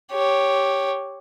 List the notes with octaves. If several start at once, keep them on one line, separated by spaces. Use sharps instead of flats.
G4 C#5